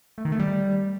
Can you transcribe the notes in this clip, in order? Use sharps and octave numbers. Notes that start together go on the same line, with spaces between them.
A3
D#3
A3
G3